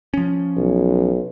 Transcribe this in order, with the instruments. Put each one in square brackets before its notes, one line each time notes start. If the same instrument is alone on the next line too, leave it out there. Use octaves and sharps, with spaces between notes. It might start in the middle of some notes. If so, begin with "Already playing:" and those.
[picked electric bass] F3 C#4
[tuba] B1